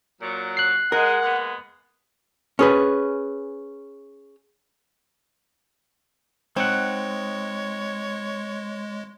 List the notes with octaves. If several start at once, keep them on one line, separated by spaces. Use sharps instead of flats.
A#2 F#3
F#6 C7
G#3 A#4 F#5
G#3 A#3 B3
C#4 G#4 B4
G#3 C4 D#4 C#5 F#5